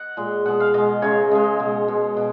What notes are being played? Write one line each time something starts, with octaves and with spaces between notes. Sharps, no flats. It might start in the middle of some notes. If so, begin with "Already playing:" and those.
Already playing: D#5 F#5
A#2 G#3
B2 G#3 F#5
F5
B2 G#3 D#5
C#3 G#3 C#5
C#3 G#3 D#5
B2 G#3
B2 G#3
B2